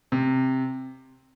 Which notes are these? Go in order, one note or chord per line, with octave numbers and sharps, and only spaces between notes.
C3